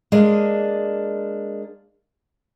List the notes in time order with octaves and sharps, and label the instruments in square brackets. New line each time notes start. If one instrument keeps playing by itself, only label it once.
[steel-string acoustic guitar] G#3 A#3 D4